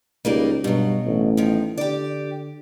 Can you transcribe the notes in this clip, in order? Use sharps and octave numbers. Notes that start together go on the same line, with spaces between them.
C#2 G3 A#3 D#4
G2 B2 F#3
A1
D#3 F3
D3 G4 D5